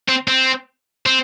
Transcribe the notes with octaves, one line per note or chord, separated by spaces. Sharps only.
C4
C4
C4